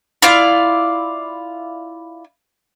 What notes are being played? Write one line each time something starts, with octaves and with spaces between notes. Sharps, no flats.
E4 F4 D5 F5